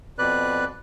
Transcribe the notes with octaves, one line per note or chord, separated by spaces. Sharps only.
F2 B2 B4 D5 F#6